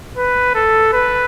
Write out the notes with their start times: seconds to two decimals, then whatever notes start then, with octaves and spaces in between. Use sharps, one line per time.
0.17 B4
0.55 A4
0.93 B4